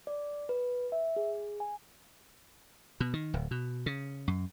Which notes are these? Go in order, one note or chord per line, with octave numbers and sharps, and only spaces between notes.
D5
B4
E5
G#4
G#5
B2
D#3
D1
B2
C#3
F#2